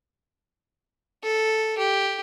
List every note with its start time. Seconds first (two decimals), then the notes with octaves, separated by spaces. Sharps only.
1.24 A4
1.78 G4